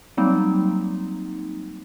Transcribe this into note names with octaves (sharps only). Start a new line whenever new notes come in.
F#3 G3 A#3 C4 D#4